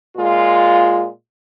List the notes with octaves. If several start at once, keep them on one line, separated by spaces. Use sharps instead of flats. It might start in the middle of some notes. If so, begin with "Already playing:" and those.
A#2 G#3 F4